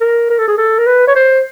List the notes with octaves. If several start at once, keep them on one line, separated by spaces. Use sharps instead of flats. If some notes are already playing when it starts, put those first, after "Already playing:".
A#4
A#4
A4
G#4
A4
A#4
B4
C#5
C5